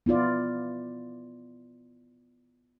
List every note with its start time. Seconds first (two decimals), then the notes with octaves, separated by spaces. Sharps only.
0.06 B3 E4 F4 D5